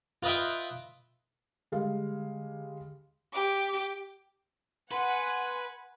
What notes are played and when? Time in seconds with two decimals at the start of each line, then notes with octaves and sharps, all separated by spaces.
0.23 F4 B4 D#5 E5 G5
1.72 D3 G3 G#3 F5
3.33 G4 D6
4.92 B4 F#5 G#5 C6